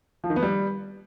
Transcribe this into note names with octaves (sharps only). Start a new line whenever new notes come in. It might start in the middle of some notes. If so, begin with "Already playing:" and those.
F3
D#3
B3
G3